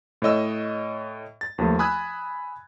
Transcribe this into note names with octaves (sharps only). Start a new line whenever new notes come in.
A2 C#5 D#5 E6
A6
D#2 F3 A3
G#5 B5 D#6 E6 F#6 G#6